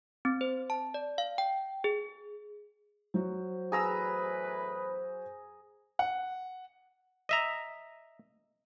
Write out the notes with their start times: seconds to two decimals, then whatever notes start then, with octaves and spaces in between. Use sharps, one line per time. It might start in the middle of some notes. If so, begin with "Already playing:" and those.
0.25 C4
0.41 C5
0.70 A5
0.94 D5
1.18 F5
1.38 G5
1.84 G#4
3.14 F#3 F#4 C5
3.72 E2 A2 G#4 B4 A#5 E6
5.99 F#5
7.29 D#5 E5 A#5